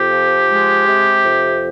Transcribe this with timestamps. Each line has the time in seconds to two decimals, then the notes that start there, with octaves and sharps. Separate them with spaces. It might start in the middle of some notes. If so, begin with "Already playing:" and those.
Already playing: F2 G4
0.11 F3
0.50 G#3
0.87 C3
1.25 F2